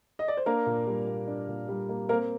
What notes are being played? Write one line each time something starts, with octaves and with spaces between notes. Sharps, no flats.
D#5
D5
C5
A#3 D4 A#4
A#2
G3
A#3
D4
A#2
G3
A#3
A#3 C4 A#4